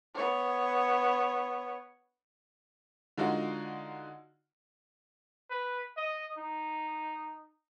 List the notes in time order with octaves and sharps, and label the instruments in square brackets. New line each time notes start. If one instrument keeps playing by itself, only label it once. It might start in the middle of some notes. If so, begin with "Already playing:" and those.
[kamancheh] B3 C#5
[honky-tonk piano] D3 G#3 D#4 F4 F#4
[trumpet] B4
D#5
D#4